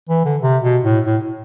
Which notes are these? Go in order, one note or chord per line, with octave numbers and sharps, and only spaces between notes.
E3
D3
C3
B2
A2
A2